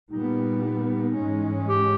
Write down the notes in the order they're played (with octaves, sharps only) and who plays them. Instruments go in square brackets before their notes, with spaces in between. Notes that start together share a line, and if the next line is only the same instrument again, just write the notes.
[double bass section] A#2 G3 B3 [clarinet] D#4
[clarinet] D#4
[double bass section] G#2 E3 G#3 C#4
[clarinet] G4